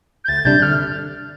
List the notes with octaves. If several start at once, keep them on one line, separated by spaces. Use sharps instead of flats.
G6
D2 A6
C3 G3 D4 G6
D3 F6